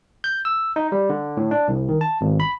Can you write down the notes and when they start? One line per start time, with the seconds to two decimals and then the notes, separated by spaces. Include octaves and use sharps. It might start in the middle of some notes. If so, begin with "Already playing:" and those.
0.24 G6
0.45 E6
0.76 D#4
0.92 G3
1.10 D3
1.37 A2
1.51 D4
1.68 C2
1.89 D#3
2.01 A5
2.21 G#1
2.40 B5